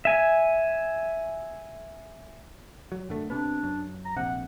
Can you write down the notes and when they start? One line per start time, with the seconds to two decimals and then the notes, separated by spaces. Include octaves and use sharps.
0.05 E5 G#5
2.92 F#3
3.09 F#2 D3 A3
3.30 C3 B3 D4
3.63 F#2
4.05 A#5
4.17 A#1 C3 F#5